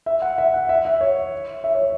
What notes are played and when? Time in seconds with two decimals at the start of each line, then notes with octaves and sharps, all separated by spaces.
0.06 E5
0.22 F#5
0.38 E5
0.54 F#5
0.69 E5
0.85 E5
1.01 C#5
1.64 E5
1.75 C#5